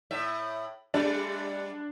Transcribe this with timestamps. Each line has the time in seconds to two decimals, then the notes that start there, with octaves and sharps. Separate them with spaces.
0.11 A2 E5
0.94 G3 D4